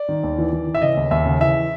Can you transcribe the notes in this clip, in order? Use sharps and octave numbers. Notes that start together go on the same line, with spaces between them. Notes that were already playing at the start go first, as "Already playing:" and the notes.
Already playing: D5
D#3
D#2
E3
E3
E3
E5
C#3 D#5
D#2
D#2 E5
C#3
E3 E5